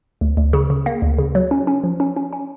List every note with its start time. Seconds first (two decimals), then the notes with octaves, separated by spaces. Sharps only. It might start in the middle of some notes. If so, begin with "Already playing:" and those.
0.21 D2
0.37 D2
0.53 C#3
0.70 C#3
0.86 A#3
1.02 D2
1.18 C#3
1.35 F#3
1.51 C#4
1.67 C#4
1.83 F3
2.00 C#4
2.17 C#4
2.33 C#4